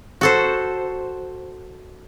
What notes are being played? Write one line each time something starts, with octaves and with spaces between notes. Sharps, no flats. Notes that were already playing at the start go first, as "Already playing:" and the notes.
F#4 A4 C5